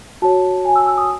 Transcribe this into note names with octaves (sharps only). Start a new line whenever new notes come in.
F#4 C#5 A5
G#5
E6
E6
D#6